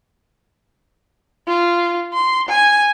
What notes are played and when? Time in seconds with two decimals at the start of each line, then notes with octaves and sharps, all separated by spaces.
1.47 F4
2.14 C6
2.49 G#5